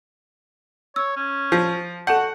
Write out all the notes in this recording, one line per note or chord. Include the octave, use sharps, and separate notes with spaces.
C#5 E6
C#4
F3 G6
F#4 A4 F#5 A5 G6